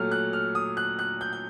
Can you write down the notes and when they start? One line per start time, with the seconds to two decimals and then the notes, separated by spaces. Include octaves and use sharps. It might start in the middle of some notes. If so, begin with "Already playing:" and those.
Already playing: A#2 F#3 A3 F6
0.11 F#6
0.33 F6
0.55 D#6
0.77 F#6
0.99 F#6
1.21 G6
1.33 G6